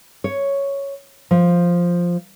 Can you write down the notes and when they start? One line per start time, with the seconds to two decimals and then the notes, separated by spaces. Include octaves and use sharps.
0.24 C#5
1.31 F3